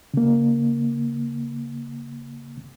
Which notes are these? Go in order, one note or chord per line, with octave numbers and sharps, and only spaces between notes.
C#3 A#3